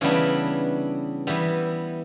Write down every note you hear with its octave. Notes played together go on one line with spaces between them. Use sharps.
C#3 E3 G3 B3 D4
E3 G3 B3